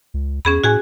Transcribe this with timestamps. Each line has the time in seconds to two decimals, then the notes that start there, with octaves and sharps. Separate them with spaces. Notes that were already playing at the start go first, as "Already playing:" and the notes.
0.14 C#2
0.45 E2 C#4 G#4 B5
0.64 A2 F#4 G#4 G#5